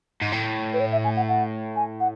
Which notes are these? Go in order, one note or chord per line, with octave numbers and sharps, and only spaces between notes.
G#2
A2
B4
C#5
E5
G#5
F#5
F#5
G#5
F#5